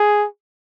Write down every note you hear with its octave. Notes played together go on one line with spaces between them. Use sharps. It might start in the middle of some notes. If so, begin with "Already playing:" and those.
Already playing: G#4